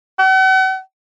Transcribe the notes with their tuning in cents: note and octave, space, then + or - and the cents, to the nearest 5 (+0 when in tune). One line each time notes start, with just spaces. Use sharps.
F#5 +40